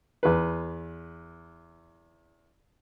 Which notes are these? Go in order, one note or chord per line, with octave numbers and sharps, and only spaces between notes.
E2 B4